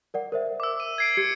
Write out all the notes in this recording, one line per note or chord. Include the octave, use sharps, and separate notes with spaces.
A#4 D5 F#5
A#4 C5 E5
D6 E6
D#7
G#6 C7 D7
G4 G#6 C#7